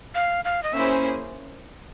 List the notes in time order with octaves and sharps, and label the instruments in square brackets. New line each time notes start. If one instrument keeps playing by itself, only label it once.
[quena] F5
F5
D#5
[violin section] A#3 C#4 E4 G#4 C5 [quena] E5